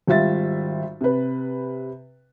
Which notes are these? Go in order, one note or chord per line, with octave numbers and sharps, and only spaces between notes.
G#1 G3 F4 E5 A6
C3 B4